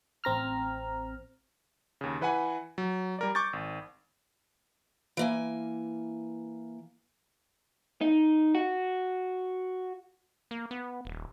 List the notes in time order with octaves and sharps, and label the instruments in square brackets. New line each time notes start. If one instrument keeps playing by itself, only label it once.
[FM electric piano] A1 C4 A#5 F6
[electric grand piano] D#2 C#3
E3 B4 F#5 G#5 B5
F#3
G3 A#4 D5
C#6 D6 G6 A6
G#1
[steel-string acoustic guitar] E3 A#3 G#5
[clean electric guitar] D#4
F#4
[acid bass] A#3
B3
D#1